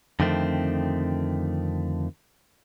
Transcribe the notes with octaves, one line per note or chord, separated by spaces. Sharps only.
F2 D3 D#3 A3 C4